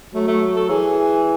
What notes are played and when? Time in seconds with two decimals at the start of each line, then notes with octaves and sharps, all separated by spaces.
0.14 F#3 A3
0.27 A3
0.56 A4
0.69 E3 G#4